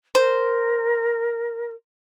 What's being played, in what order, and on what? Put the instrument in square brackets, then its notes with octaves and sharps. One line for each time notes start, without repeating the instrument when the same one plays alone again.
[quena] A#4 [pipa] C5